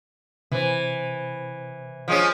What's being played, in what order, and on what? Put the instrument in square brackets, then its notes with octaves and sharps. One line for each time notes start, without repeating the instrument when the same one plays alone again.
[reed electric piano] C3 C5 [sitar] E3
[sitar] F3 G#3 C#4